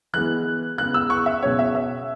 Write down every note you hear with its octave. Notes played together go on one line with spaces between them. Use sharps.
E3 G#3 B3 F#6
C#3 G#3 B3 F#6
E6
C#6
E5
B2 G#3 C#4 C#5
E5
E5